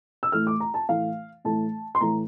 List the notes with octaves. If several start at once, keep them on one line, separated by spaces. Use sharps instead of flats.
E6
A2 E3 A3 F6
D6
A#5
A5
A2 E3 A3 F5
A2 E3 A3 A5
C6
A2 E3 A3 A#5